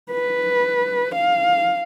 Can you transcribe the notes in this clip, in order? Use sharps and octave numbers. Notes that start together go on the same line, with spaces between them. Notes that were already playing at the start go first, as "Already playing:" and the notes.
B4
F5